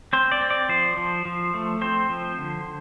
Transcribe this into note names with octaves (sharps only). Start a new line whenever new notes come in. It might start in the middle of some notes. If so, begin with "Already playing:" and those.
C4 C5
D5
C4
D5
F3 C5
F3
F3
A3
C4 C5
F3
D3